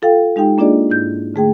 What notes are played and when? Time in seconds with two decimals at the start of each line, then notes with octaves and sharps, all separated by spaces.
0.02 F4 A4 F5 G5
0.36 G#3 D#4 G4 G5
0.58 A#3 D4 F4 G#4 D5 D#5
0.89 G#2 E4 G6
1.34 D3 A3 G#4 G5